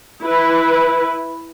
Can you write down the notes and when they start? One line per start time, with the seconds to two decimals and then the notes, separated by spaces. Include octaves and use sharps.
0.23 E4 B4